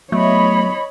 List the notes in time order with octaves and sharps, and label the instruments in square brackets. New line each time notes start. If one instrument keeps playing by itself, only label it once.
[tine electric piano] F#3 B3 [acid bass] A3 [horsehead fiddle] C#5 D#5 [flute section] B5